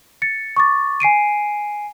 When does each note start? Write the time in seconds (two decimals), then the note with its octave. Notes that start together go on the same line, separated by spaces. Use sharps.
0.22 A6 C#7
0.57 C#6 D6 A6
1.00 G#5 C7 D7 D#7